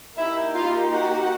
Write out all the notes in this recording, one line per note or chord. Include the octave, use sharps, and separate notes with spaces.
A#3 D#4 E4 G4 E5
F4 F5
F#4 F#5